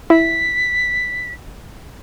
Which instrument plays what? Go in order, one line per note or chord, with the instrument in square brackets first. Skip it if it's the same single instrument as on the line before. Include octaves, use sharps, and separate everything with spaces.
[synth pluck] E4 [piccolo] B6